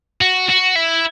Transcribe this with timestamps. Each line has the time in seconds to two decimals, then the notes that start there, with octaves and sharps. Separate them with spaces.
0.21 F#4
0.49 F#4
0.76 E4